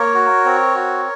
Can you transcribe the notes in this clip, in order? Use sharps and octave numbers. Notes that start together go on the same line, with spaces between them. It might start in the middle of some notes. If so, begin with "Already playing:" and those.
Already playing: A#3 A#4 C#5
F#4
C4
F#4